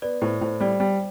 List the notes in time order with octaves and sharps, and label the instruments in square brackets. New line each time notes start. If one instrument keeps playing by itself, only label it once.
[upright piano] B3 [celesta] D5
[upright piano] A2 [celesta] C5
[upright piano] A2 [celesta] C5
[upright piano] G3 [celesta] D5
[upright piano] G3 [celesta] G5